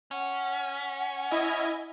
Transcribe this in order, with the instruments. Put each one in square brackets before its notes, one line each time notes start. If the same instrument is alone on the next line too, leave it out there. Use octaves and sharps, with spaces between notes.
[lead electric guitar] C#4 [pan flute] F#5
[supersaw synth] E4 D#5 G#6